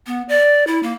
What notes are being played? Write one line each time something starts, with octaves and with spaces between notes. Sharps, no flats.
B3
D5
E4
A#3